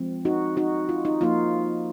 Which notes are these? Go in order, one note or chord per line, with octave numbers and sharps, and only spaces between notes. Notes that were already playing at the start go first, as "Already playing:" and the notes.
Already playing: F3 G#3 C4
D#4 F#4
D#4 F#4
F4
D#4
F3 A#3 D#4 F4